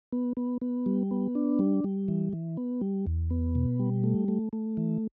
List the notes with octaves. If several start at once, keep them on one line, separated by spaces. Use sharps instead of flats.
B3
B3
B3
G3
B3
D4
G3
G3
E3
E3
B3
G3
E2
B3
B2
G3
A3
A3
A3
E3